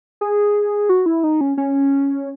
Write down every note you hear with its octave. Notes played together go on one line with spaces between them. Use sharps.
G#4
F#4
E4
D#4
C#4
C#4